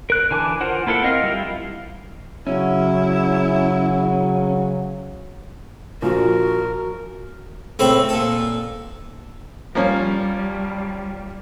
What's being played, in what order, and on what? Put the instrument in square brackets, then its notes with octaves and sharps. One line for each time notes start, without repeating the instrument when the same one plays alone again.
[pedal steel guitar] A#4 F#6
D3 E3 G#5 A5 D6
F4 A#4 C5 F#5
A#3 E4 A4 A#4 F#5
C4 A#4 D#5 F5
G3 E4 F4
[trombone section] C#3 F#3 [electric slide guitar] C#4 [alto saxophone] E4
[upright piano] A#1 F3 [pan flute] F#4 [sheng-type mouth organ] A#4
[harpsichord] C#2 A2 C4 E5 B5
A#2 A4
[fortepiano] F3 A#3 C#4 [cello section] G3